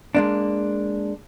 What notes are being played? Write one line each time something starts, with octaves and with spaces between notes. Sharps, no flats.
G#3 A#3 D4